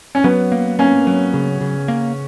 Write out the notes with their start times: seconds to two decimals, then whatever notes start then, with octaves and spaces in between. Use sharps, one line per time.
0.15 C#4
0.24 F#3 B3
0.52 A#3
0.79 A#3 C#4
1.07 F#3
1.34 C#3
1.61 C#3
1.88 A#3